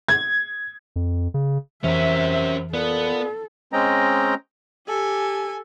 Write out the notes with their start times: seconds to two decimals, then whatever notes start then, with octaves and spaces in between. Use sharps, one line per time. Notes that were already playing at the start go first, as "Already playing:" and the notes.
0.08 G#6
0.96 F2
1.34 C#3
1.84 F2 C3 E3 C#4 A#4 E5
2.73 A#2 B3 A4
3.73 G#3 C4 C#4 D#5 G5 A#5
4.88 G4 A4 G#5